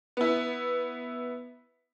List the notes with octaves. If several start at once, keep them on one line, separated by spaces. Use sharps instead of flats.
B3 E4